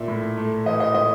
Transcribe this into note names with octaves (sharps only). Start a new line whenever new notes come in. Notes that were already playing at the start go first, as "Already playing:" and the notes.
Already playing: A#2 E5
A2
A3
E3 D#5
D#5
A2 D#5